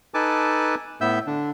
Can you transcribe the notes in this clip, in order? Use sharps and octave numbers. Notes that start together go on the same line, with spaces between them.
D#4 A4 B4 G#5 A5 D6
A2 B3 E5 E6 G6
D3 D4